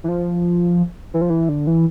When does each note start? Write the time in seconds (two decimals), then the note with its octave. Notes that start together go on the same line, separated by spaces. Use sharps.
0.04 E3
0.08 F3
1.14 E3
1.21 F3
1.30 E3
1.49 D3
1.67 E3